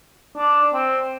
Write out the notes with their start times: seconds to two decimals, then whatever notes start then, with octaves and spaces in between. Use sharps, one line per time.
0.37 D4
0.74 C4